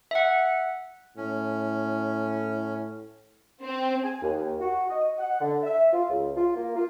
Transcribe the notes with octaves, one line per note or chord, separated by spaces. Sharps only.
E5 F#5
A2 C#4
C4
G#5
D#2
F#4
D#5
F#5
D3
E5
F4
C#2
F4
A#3
F4